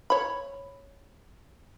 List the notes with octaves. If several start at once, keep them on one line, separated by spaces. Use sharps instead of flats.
C#5 B5